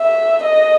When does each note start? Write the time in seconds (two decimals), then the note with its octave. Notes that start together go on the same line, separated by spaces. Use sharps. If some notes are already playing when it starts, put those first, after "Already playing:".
Already playing: E5
0.43 D#5